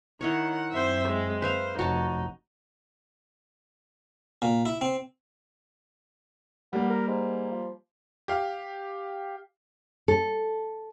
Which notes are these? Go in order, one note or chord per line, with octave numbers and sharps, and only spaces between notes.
D#3 D#4 E4 C#5 F#5
F#2 C4 C5 E5
G#3
B4 C5 E5 F5
F1 D#4 F#4 C#5 A5
A#2
E4
C4
G3 A#3 B3
A#4
G#2
F3
G4 F5
A4